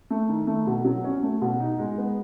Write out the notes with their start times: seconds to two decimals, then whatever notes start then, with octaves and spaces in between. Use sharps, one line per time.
0.10 A3
0.29 D#3
0.47 A3
0.67 B2
0.84 F#3
1.04 C#4
1.23 A3
1.42 B2
1.60 D#4
1.79 G#3
1.98 B3